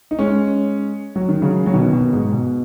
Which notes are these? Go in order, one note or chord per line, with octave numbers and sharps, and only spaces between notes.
D#4
G#3 C#4
F#3
D#3
C#3 F#3
F#3
B2 D#3
B2
G#2
B2